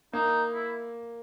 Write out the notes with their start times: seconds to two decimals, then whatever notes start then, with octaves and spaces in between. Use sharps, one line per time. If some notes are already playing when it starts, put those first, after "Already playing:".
0.13 A#3 D#4
0.54 E4